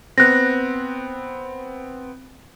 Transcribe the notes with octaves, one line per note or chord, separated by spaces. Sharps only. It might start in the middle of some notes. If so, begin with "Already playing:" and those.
B3 C4 F#6 A#6